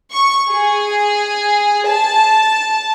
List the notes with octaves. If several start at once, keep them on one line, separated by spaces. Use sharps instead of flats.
C#6
G#4
A5